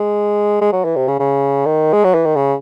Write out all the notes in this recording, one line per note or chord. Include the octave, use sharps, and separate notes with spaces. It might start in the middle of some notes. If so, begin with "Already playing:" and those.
Already playing: G#3
G#3
F#3
E3
C3
C#3
C#3
D#3
G#3
F#3
E3
D#3
C#3